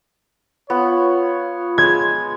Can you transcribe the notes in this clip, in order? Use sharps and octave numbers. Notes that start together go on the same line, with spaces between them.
B3 F4 C#5
G#3 G#6